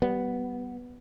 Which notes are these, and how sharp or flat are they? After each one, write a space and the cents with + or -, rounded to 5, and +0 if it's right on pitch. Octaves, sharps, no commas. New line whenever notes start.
G3 -20 B3 +0